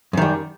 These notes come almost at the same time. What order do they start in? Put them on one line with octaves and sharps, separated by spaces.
F#2 D#3 G3